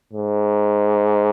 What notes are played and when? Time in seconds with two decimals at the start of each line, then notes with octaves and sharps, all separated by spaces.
0.13 G#2